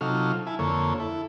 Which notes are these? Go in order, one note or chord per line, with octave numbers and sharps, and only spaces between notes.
C3 F#3 D#4 F4 A4 F6
E4 G#5 A5
F2 D3 A#3 A4 C#5
E4 A4